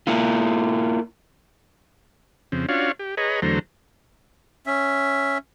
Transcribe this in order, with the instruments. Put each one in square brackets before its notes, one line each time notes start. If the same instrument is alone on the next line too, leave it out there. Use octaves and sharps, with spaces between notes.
[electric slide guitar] A#3 E4 F4
[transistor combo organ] F2 C#3 C4
C#4 D4 F4 F#4 C#5 F5
G4
G#4 B4 C#5 D#5 A#5
E2 D3 F#3 A3 C5 A#5
[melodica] C#4 E5